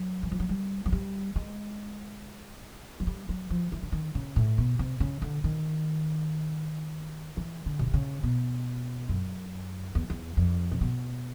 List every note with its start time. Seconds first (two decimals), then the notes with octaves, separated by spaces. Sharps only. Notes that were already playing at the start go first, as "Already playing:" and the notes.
Already playing: F#3
0.23 E3
0.32 F3
0.40 F#3
0.49 G3
0.86 F#3
0.92 G3
1.36 G#3
3.00 F#3
3.07 G3
3.29 F#3
3.50 F3
3.72 E3
3.83 D3
3.92 D#3
4.15 C#3
4.36 A2
4.58 B2
4.79 C3
5.00 C#3
5.22 D3
5.44 D#3
7.37 E3
7.66 D3
7.79 B2
7.87 C3
7.94 C#3
8.23 B2
9.09 F#2
9.95 E2
10.10 E2
10.37 F2
10.71 C3
10.81 B2